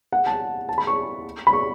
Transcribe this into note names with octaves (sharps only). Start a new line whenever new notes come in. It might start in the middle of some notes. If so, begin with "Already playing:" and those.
F#5
A5
A5
B5
C#6
B5
C#6